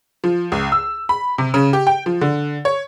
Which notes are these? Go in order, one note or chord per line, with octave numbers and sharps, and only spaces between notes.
F3
C#2
E6
B5
C3
C#3
G4
G5
F3
D3
C#5